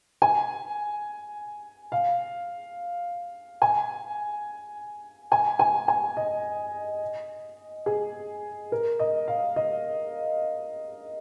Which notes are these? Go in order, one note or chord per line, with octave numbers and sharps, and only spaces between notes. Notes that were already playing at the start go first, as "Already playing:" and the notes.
G#5
F5
G#5
G#5
G#5
G#5
D#5
G#4
A#4
D#5
F5
D#5